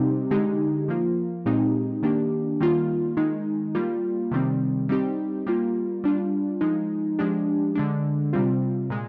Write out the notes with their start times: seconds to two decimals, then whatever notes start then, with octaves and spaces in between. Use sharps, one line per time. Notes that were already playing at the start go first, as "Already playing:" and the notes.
Already playing: C3 G3 C4 D#4 G4
0.31 D3 G#3 D#4 G4
0.88 F3 A#3 F4
1.46 A#2 G#3 C4 D#4 G4
2.02 D#3 A#3 D4 G4
2.60 D#3 G3 A#3 F4
3.17 D#3 G#3 D#4
3.75 G3 A#3 F4
4.31 C3 D#3 G3 C4
4.89 G3 C4 D#4 G4
5.46 G3 A#3 F4
6.04 G3 D4 F4
6.61 F3 G#3 D#4
7.19 F3 G#3 D4 G4
7.75 D3 G#3 D4
8.33 C3 G3 C4 F4
8.90 A#2 G#3